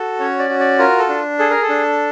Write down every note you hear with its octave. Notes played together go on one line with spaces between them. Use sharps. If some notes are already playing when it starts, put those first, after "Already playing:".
Already playing: F#4 A4
C#4 C#5
D5
F#4
D5
F4 A#4
A4
D4
G#4 A4
A#4
A4
D4